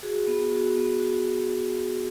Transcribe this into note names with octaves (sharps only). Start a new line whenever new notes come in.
F#4 G#4
B3
F#4
B3
F#4